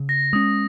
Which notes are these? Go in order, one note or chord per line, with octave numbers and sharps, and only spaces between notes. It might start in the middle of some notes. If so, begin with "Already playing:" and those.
Already playing: C#3
A#6
G#3 C#4 D#6